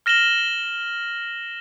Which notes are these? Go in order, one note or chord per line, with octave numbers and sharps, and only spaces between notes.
F6 A#6 E7 F#7 G7